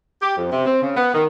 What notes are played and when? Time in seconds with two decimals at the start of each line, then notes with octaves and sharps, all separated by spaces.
0.22 G4
0.37 F2
0.52 C3
0.66 C4
0.82 C#3
0.97 B3
1.14 D#3